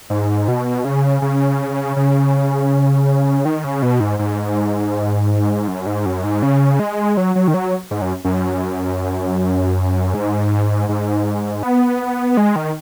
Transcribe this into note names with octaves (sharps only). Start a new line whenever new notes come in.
G#2
B2
C#3
C#3
C#3
D#3
C#3
B2
G#2
G#2
F#2
G#2
F#2
G#2
C#3
G#3
F#3
F#3
D#3
F#3
G#2
F#2
F#2
G#2
G#2
B3
G#3
D#3